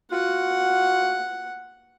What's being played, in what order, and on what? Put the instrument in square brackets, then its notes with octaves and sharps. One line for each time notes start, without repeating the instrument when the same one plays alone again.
[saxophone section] F4 F#4 [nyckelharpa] F#5